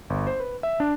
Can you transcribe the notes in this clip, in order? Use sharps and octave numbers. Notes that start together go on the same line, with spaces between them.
G1
C5
B4
E5
D4